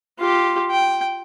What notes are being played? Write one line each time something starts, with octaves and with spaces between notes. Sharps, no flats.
F4 G4
G5